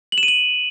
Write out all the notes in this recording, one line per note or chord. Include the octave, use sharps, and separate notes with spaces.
F#7
E7
D#7
F#7